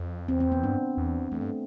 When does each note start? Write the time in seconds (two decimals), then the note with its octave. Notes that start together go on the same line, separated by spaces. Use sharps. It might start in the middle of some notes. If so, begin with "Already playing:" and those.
Already playing: F2
0.28 E2 C4
0.40 C4
0.52 B3
0.63 G2 D4
0.97 E2
1.32 E2 A3
1.41 G2